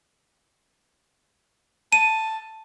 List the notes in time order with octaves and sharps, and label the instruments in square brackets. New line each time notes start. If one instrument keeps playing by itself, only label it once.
[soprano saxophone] A5 [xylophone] D#7